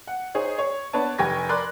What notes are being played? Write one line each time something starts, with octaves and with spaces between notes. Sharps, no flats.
F#5
D#4 G#4 C5 C#5
C#5
B3 D4 B4 C#5 A5
F1 G4 G#5 C#6 G#6 A#6
A#4 D5 B5 C6 F#6